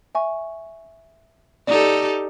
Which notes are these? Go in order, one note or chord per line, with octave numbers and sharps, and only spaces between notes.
E5 G#5 C#6
D#4 G4 A4 D5